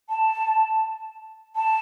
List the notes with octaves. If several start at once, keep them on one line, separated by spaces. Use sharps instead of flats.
A5
A5